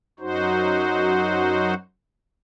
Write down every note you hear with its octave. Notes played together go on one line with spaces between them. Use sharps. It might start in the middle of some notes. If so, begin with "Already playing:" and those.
F#2 F#3 D#4 F#4 C5